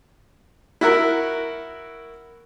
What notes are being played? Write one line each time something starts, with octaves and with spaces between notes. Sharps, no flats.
E4 F#4 A#4